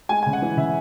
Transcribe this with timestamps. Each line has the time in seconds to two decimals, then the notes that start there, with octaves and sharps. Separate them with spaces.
0.09 G#3 G#5
0.23 C#3 G#5
0.33 F#5
0.42 E3
0.57 C#3 E5